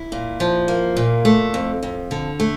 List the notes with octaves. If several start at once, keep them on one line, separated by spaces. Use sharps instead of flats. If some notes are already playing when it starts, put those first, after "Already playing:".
Already playing: E4
A#2
F3
A#3
A#2
A3
F2
F2
D3
A3